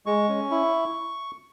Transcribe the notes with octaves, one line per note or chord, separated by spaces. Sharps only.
G#3 C#6
C#4
E4